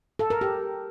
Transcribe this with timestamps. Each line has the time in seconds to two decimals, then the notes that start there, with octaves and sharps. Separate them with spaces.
0.19 A4
0.30 A#4
0.41 G4